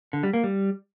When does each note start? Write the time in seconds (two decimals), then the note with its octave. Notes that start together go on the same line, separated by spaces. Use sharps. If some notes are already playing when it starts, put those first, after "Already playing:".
0.13 D3
0.23 G3
0.33 A#3
0.44 G3